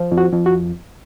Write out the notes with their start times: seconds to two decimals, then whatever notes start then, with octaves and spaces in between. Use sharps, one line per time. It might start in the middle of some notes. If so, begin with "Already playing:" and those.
Already playing: F3
0.11 F2
0.17 F#4
0.32 F2
0.46 F#4